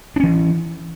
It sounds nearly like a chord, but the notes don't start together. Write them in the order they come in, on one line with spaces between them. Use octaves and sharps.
D4 C#4 E3